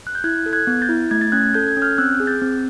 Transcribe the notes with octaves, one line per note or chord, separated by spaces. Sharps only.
F#6
G6
E4 F#6 G#6
A4
F#6 G#6
B3
G6 A6
E4
A3 G#6
A6
C#4 F#6 G#6
A4 G6
G#6
C#4
F6 G6
C4 E6 F#6
G#4
G6 A6
C4